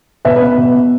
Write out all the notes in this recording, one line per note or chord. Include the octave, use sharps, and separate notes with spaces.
B2 B4 E5
B4
B3
B2
B3